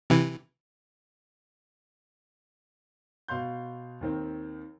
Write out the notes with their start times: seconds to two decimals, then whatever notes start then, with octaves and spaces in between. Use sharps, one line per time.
0.10 C3 E3
3.28 B2 F5 C6 G6
4.01 D#2 D#3 C4